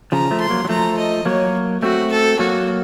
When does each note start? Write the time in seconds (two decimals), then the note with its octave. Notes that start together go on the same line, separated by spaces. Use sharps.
0.12 C#3 F3 A#5
0.31 F3 A3
0.40 C6
0.50 F#3 A#3
0.65 F#3
0.69 F3 A3 A#5
0.97 D#5
1.25 F#3 A#3 C#5
1.82 A3 C4 F#4
2.11 A4
2.39 F#3 A#3 F#4